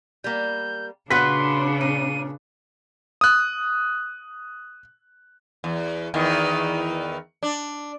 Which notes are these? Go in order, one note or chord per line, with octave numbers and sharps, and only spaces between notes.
G3 A#3 G6
A#2 C#3 D4 F#4 B4 C6 F#6 B6
A#2 D#7
D#6 F#6
E2
E2 D#3 E3
D4